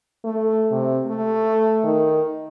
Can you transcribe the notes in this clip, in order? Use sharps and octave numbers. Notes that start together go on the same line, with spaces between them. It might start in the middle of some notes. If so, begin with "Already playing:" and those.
A3
C3
A3
D#3